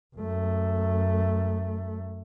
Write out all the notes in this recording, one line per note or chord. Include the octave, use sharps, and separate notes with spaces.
F#2 A3